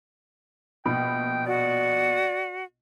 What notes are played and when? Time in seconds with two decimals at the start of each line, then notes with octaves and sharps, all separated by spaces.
0.86 A#1 B2 G5 B5
1.46 F#4 D5